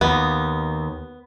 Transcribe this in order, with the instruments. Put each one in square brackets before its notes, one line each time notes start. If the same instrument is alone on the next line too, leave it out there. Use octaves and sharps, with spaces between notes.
[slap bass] D#2 [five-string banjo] B3